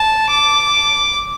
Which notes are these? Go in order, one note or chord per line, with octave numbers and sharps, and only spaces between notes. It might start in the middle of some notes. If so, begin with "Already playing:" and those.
Already playing: A5
D6